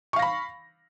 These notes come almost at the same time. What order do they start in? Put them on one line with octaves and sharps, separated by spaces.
C#6 F5 A#6 B5